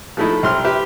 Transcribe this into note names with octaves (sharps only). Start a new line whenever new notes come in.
F3 G#3 A3 D#4 E4
C2 C6 F6
G4 B4 E5